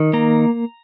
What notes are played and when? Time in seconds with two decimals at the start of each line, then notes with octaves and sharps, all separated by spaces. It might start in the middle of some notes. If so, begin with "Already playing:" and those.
Already playing: D#3
0.13 A#3 A#5